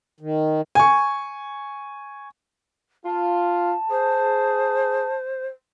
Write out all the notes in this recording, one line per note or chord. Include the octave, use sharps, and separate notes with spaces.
D#3
G#5 C#6
F4 A5
G#4 C5